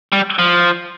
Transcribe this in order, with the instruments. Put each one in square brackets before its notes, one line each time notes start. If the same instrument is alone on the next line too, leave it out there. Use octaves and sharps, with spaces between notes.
[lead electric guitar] G3
F3